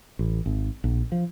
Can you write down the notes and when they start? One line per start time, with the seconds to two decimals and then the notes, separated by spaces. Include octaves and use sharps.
0.19 A1
0.46 G#1
0.84 A#1
1.12 F3